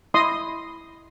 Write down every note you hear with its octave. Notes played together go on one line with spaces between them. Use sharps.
E4 D#5 C6 D#6